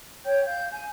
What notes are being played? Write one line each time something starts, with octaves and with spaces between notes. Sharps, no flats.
C#5 G5 G6
F5 G6
G#5 G6